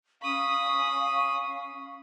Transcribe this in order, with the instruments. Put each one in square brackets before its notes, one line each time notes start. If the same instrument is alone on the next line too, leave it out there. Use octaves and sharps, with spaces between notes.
[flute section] C#4 F5 C#6 [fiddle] B5 D#6